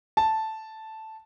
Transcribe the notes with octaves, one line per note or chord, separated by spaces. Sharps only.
A5